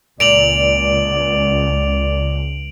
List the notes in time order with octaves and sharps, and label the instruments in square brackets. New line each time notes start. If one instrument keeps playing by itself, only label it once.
[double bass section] C#2 [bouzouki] A#2 [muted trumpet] D5 [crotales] D7 F7 F#7